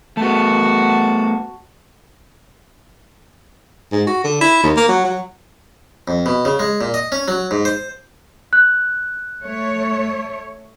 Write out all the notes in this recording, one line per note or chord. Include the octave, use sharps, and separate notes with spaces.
A3 B3 F#4 A5
G#2
F#4
D3
E4
D#2
A#3
F#3
F#3
F2
B2
C#3
G#3
A#2
D#5
C#4
F#3
G#2
C5
F#6
A3 C#5